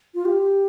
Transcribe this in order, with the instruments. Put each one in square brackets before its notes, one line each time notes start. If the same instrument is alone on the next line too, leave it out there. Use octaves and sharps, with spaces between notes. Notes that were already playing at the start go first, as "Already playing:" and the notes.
[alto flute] F4
G4